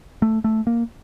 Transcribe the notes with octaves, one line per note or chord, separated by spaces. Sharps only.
A3
A3
A#3